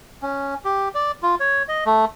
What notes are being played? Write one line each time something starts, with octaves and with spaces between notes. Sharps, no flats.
C#4
G4
D5
F4
C#5
D#5
A3